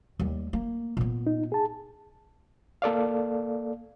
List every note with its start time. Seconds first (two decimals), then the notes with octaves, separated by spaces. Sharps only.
0.19 D#2 G3
0.53 A#3
0.97 A#2 B3
1.27 D#4
1.52 G#4 A5
2.82 A#3 A4 D5 F5